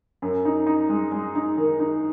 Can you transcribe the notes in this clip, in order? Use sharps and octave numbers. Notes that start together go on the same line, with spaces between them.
F#2
D#4
D#4
G#3
G#3
D#4
D#3
D#4